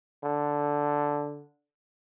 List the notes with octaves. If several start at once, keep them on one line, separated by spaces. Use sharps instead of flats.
D3